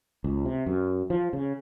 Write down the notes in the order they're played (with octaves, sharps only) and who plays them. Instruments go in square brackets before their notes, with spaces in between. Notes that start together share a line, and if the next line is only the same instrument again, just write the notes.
[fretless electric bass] C#2
C3
F#2
F3
C#3